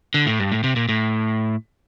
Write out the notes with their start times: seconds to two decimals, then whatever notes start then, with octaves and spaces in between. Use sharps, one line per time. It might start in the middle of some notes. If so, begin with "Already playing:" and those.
0.14 D3
0.27 A2
0.40 G2
0.52 A2
0.64 C3
0.76 A#2
0.89 A2